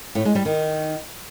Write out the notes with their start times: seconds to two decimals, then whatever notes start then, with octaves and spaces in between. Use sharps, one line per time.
0.15 A2
0.25 G#3
0.35 G3
0.45 D#3